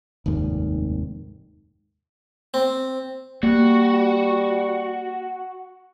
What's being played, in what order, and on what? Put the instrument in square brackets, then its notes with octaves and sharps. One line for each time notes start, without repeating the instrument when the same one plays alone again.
[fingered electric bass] F1 D#2 G#2 D#3
[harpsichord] C4
[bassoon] G3 [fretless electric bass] A#3 [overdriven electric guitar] F#4